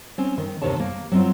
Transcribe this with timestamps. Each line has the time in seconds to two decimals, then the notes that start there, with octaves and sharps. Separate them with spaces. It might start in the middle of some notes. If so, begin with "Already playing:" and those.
0.18 C4 C#4
0.38 D#3
0.62 D#2 C3 D#3 C4 C#5 A5
0.80 A#3
1.12 F#3 C4 F4